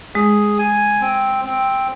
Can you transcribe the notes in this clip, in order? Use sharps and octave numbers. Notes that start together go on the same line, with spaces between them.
G#3 G#4
G#5
C4
C4